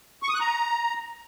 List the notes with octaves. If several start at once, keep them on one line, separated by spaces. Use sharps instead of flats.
C#6
D#6
F#6
A#5